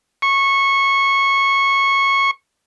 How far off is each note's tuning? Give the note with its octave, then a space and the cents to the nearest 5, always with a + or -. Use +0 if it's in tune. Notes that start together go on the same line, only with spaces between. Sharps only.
C#6 -15